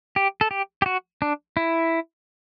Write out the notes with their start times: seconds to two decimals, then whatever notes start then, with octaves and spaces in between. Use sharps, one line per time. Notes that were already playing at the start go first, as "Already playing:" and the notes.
0.16 G4
0.41 A4
0.51 G4
0.82 G4
0.86 F#4
1.22 D4
1.57 E4